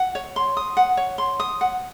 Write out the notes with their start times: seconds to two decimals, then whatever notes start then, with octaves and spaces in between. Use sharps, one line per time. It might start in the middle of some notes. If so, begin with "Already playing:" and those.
Already playing: F#5
0.15 C#5
0.36 C6
0.57 D#6
0.77 F#5
0.97 C#5
1.18 C6
1.40 D#6
1.61 F#5